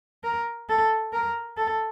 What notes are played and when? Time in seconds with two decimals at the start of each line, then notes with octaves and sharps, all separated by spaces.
0.24 A#4
0.69 A4
1.13 A#4
1.58 A4